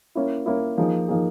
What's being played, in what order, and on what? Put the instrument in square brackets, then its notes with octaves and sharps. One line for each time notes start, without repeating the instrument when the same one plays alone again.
[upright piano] A#3 C#4 E4
A#3 C#4 E4
F3 A#3 D#4 G#4
F3 A#3 D#4 G#4